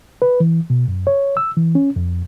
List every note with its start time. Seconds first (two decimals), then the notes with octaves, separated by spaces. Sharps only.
0.22 B4
0.40 E3
0.70 B2
0.88 F#2
1.07 C#5
1.37 E6
1.57 E3
1.75 C#4
1.96 F2